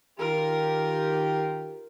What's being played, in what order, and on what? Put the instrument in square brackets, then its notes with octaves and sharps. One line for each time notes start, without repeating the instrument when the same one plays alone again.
[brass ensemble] D#3 G4 [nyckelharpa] F4 A#4